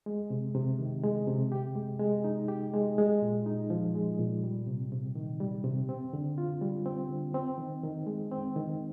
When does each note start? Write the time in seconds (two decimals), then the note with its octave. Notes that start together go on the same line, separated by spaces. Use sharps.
0.06 G#3
0.30 C3
0.55 C3
0.79 D#3
1.03 G#3
1.27 C3
1.52 G4
1.75 G#3
2.00 G#3
2.24 D#4
2.48 G4
2.74 G#3
2.98 G#3
3.22 A#2
3.46 D#4
3.70 F3
3.95 G#3
4.19 A#2
4.44 G3
4.67 C3
4.92 C3
5.15 D#3
5.40 G3
5.64 C3
5.89 C4
6.13 D3
6.38 F4
6.61 G3
6.86 C4
7.10 D3
7.34 C4
7.58 D#3
7.83 D#3
8.07 G#3
8.31 C4
8.56 D#3